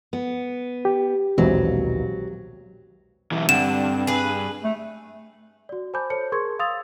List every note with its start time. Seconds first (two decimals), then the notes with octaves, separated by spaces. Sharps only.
0.13 B3
0.85 G4
1.38 A#1 D#2 B2 E3 F#3 G#3 C4
3.32 B1 E3
3.49 G2 D3 C4 E7
4.07 G#4 B4
4.64 A3
5.69 F#4 D5
5.94 C5 G#5 A5 B5 D6 G6
6.10 A4 C5 C#5 A5 C#7
6.32 G#4 A#4 C6 C#6 G#6
6.59 F5 C6 D#6 E6 A6 F7